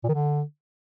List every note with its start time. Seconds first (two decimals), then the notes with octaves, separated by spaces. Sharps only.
0.04 A#2
0.09 D#3
0.14 D3